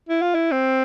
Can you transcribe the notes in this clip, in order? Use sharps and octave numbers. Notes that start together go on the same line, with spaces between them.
E4
F4
E4
C4